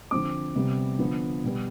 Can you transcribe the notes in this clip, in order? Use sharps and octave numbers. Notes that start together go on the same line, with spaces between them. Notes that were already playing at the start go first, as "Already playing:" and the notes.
D3 F3 C4 D6
C3 G3 B3
D3 F3 B3
B2 G3 B3